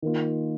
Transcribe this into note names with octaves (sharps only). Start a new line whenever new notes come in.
D#3 A#3 F4